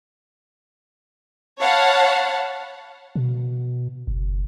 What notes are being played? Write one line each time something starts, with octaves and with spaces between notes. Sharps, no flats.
C#5 F5 F#5 A5 B5
B2
F#1